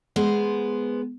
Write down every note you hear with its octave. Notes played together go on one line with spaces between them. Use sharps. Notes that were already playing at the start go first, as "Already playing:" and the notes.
G#3 B3 C5